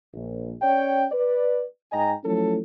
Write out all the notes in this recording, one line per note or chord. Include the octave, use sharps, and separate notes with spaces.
A#1
C#4 C#5 D5 G5
B4 D5
G#2 D#5 G5 G#5 A#5
F3 F#3 A3 C#4 E4 A4